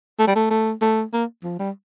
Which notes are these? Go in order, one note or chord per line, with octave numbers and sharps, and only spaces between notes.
A3
G3
A3
A3
A3
A#3
F3
G3